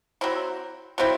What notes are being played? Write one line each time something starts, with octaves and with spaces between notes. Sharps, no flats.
F#3 C4 E4
F#3 C4 E4